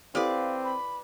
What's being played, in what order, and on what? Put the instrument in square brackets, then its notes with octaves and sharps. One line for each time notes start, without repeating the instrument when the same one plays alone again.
[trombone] C4 [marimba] E4 G4 A4 [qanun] B4 D5 [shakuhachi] F5
[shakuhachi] B5